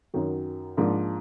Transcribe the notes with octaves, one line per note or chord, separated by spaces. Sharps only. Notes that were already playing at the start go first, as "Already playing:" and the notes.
F#2 D#3 F#3
G#2 F3 A#3 D4